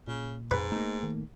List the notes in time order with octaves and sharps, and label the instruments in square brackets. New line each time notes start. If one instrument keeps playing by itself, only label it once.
[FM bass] A#2 [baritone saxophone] C#3
[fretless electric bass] F2 [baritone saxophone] G#2 [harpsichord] B4
[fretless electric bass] A3 A#3 [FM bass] D#4
[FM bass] D#3